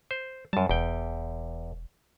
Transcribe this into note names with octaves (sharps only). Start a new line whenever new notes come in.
C5
F#2 G3 A5
E1 E2 G5